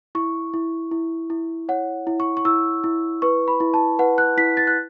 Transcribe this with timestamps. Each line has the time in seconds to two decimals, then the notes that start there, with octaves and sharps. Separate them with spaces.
0.15 E4 C#6
0.54 E4
0.92 E4
1.30 E4
1.69 C#5 F#5
2.07 E4
2.20 C#6
2.37 C#6
2.45 E4 E6
2.84 E4
3.22 B4 C#6
3.48 B5
3.60 E4
3.74 A5
3.99 B4 F#5
4.18 F#6
4.37 E4 B6
4.57 A6
4.67 F#6